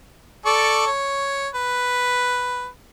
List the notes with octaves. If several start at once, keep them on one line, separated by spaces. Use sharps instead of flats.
A4 D5 C#6
C#5
B4